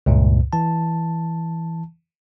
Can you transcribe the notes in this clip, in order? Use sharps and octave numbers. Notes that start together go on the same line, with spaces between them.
C#2 G2 A#2
E3 A5